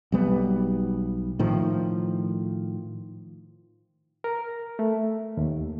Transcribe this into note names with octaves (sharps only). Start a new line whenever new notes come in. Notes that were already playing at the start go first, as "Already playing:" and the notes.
B1 G3 B3
A2 D#3 F3
A#4
A3
D#2